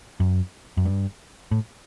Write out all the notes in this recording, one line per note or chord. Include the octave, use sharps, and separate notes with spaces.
F#2
F#2
G2
A2